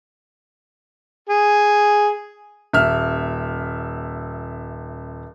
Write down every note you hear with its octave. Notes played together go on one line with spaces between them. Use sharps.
G#4
D#1 E5 F6